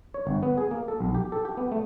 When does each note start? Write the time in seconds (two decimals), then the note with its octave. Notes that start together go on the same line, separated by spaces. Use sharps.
0.14 C#5
0.27 G1
0.43 B3
0.58 G#4
0.71 A#3
0.88 A4
1.01 B1
1.15 G4
1.32 A4
1.45 G4
1.57 B3
1.72 A3